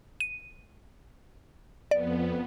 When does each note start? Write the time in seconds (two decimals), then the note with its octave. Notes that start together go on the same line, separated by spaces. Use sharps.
0.20 D#7
1.91 F2 B3 D5